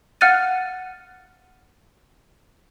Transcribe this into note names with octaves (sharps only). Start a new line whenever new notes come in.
F5 F#5 F6 F#6 A6 D#7